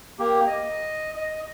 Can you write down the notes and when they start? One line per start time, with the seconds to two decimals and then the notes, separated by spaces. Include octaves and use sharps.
0.19 A#3 G4
0.47 D#5
1.16 D#5